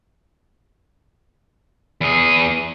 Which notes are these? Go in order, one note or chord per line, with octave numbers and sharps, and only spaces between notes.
E2 G#4